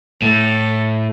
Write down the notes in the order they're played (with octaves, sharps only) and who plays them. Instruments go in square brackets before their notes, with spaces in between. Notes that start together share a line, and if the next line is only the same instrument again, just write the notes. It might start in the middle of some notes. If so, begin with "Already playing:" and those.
[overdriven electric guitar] A2 [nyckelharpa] A4